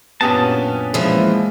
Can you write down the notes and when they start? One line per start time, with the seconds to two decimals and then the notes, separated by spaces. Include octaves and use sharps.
0.21 F#2 A#2 B3 C#4 D4 G4 A5 D#6
0.94 E3 F3 G#3 A#3